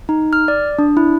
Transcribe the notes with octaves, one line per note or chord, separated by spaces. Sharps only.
D#4
F6
D5
D4
E4